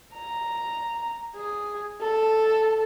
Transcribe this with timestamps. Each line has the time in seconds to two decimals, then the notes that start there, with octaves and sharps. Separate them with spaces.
0.16 A#5
1.36 G#4
2.02 A4